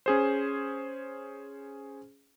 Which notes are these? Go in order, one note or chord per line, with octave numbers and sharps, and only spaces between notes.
C#4 G#4 C5